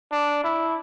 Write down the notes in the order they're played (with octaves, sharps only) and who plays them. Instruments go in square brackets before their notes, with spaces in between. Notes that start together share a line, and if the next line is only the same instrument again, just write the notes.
[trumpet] D4
E4